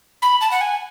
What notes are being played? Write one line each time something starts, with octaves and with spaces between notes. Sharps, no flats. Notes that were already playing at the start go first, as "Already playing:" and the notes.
B5
A5
F#5
G#5